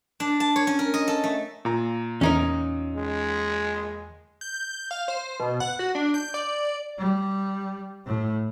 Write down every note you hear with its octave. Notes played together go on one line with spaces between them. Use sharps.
D4
A5
C#5
C#4
A#4
D#5
A4
A3
A#2 A#5
E2 C#4 D#4 A#4
G#3
G6
F5
C5
B2
F#5
F#4
D4
G6
D5
G3
A2